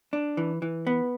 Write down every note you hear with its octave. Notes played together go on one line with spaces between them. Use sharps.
D4
E3
E3
B3